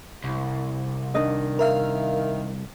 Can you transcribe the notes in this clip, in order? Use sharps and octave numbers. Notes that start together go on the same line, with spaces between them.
C2
D#3 D4 D#5
A#4 E5 F5